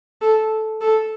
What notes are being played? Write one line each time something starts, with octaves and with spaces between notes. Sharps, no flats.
A4
A4